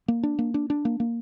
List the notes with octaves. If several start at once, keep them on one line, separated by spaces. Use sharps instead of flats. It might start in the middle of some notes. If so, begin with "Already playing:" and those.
A#3
D4
A#3
D4
D4
A#3
A#3